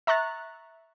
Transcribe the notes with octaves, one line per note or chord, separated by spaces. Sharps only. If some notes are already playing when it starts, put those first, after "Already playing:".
E5 A#5 C#6 F#6 A6